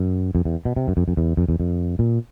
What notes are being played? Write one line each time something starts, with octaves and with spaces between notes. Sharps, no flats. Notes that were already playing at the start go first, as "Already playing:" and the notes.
Already playing: F#2
F2
E2
B2
C3
F#2
F2
F2
E2
F2
E2
F2
A#2